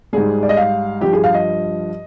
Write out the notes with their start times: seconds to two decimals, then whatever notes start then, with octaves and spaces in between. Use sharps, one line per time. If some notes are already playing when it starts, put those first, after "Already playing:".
0.13 G#2 G3 G#4
0.43 D5
0.49 D#5
0.57 F5
1.01 G2 F3 G4
1.13 G#4
1.24 F5
1.34 D#5